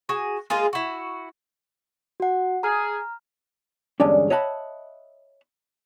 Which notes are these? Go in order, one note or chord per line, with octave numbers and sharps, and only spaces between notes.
F#4 G#4 G#5
G#3 A#3 F4 G#4
E4 F#4
F#4 F#5
G#4 A#5 F6
E2 G2 D3 G#3 C#4 D4
C#5 D#5 E5 F#5 A5 B5